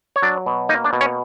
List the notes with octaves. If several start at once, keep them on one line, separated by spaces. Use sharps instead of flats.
C#5
F#3 D4 D5
B2
A#3 D#4 D#5
D4 D5
B2
C#4 C#5